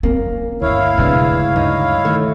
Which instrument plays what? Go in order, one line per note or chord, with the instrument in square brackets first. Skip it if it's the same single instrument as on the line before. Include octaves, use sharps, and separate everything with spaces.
[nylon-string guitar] A#3 [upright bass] C#4
[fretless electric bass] G1 D2 [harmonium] E4 C#5 F5
[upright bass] C#3 G#3 [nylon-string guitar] E3 D4
[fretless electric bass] D2 G2 [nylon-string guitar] D#4
[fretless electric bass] D#3 [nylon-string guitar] A3